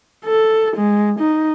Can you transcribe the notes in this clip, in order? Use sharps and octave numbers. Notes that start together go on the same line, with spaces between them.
A4
G#3
D#4